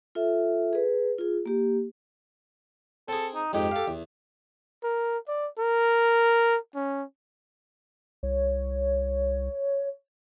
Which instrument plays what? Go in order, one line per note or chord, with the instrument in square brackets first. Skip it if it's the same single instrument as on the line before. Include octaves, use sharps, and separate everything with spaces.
[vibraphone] F4 A4 E5
G#4 B4
F4 G#4
A#3 G4
[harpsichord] C4 G#4 [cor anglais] A4
[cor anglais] D#4
[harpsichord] F2 G#2 D#4 [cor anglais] G4
[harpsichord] A4 F5
E2
[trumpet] A#4
D5
A#4
C#4
[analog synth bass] C2 [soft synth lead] C#5